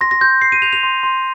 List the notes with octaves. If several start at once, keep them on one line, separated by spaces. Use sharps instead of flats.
C6 A#6
A#6
C6 G6
G6 C7
D#7
G6 F7
F7
C6
C6